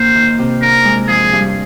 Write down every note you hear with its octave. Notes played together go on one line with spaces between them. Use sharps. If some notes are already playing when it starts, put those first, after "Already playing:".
Already playing: A#2 A#3 C5
D#3
C3
D4 A#4
G#3
F3 G#4
G2